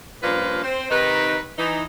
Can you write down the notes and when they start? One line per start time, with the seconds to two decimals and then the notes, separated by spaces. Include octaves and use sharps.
0.23 G2 A#2 F3 C#4 B4 F5
0.64 C4 C5
0.90 C3 D#3 D#4 B4
1.58 E3 D#4